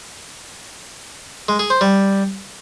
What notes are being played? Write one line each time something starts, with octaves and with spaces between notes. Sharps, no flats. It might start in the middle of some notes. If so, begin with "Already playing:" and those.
G#3
G#4
C5
G3